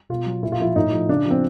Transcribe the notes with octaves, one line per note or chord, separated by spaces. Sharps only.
B2 F4
F#3
A#2 E4
F4
F3 E4
A2 D#4
F3
C#3 D4
F3 C4